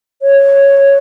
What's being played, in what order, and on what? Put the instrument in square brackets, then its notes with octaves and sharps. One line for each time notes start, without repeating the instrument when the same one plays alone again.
[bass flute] C#5